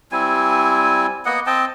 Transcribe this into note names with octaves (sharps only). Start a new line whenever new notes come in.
G3 C4 E4 G#5
A#3 B3 D#5 F#5
C4 D#5 G5 A5